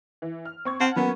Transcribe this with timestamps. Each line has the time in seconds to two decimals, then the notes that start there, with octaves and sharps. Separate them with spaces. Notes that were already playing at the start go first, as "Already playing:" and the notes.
0.22 E3
0.45 F6
0.65 C4 C#6 G#6
0.80 C4 F#5 A5 F6
0.96 F#3 A#3 B3 C#4